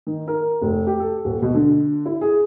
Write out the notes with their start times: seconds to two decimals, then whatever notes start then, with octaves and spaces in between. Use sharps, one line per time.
0.07 D#3
0.28 A#4
0.62 F1
0.87 G4
1.00 A4
1.25 D#1
1.42 B2
1.54 D3
2.06 E4
2.21 G#4